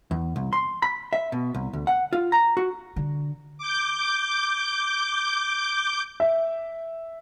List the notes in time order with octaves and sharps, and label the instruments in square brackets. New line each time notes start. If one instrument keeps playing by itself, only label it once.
[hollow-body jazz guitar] E2
C2
C6
B5
E5
B2
C2
D2
F#5
F4
A#5
F#4
[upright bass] D3
[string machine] D6 G6
[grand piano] E5